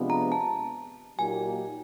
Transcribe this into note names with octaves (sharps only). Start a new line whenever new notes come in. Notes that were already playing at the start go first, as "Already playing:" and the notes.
Already playing: C3 F3 G#3 B3 D4
A#5
A5
A#2 F#3 A#3 D#4 G4 G#5